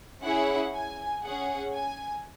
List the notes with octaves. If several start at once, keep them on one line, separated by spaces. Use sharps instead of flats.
C#4 E4 G#4 F#5
G#5
C#4 G#4 F#5
G#5